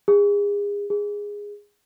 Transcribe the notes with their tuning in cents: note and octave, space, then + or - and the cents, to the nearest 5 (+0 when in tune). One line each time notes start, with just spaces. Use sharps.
G#4 -35
G#4 -15